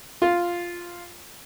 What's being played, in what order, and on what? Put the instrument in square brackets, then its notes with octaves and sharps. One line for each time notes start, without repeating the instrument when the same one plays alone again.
[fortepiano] F4